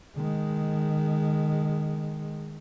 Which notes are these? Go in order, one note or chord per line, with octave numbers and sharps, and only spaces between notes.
D#3 G#3